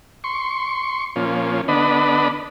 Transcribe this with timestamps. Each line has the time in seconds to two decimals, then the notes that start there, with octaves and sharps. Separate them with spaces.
0.24 C6 C#6
1.16 A#2 F3 C#4
1.68 D3 B3 D4 D#5 B5